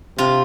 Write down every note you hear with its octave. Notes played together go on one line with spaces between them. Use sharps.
C3 F4